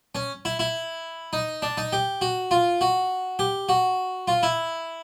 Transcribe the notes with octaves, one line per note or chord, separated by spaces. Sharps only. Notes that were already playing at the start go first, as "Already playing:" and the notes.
C#4
E4
E4
D#4
D4
D#4
G4
F#4
F4
F#4
G4
F#4
F4
E4